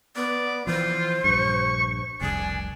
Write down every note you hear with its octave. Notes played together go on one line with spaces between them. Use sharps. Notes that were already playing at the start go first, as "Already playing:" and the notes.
B3 D5
E3 F3 F4 C5
A#1 G2 C#6
F1 C2 D4 G#5